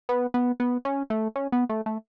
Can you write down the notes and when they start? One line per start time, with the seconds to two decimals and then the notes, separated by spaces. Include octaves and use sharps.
0.09 B3
0.34 B3
0.60 B3
0.85 C#4
1.10 A3
1.36 C#4
1.52 B3
1.69 A3
1.86 A3